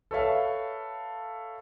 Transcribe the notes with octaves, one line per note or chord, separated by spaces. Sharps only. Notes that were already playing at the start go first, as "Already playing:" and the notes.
A4 B4 C#5 E5 F5 A5